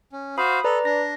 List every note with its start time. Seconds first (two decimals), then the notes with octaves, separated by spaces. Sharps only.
0.12 C#4
0.38 F#4 C5 F5 B5 D#6
0.64 A4 B4 D5 A#5
0.85 D4 A#6